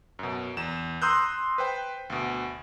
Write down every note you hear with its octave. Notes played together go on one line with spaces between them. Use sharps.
F#2 B2
E2 E7
A#5 C6 D#6 E6 F#6 G6
B4 C5 G5
D2 B2